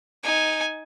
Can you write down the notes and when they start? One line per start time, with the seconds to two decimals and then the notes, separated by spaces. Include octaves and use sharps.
0.23 D#4 G#5